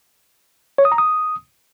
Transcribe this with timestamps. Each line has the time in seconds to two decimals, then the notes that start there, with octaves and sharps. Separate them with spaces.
0.78 C#5
0.85 D#6
0.92 A#5
0.98 D#6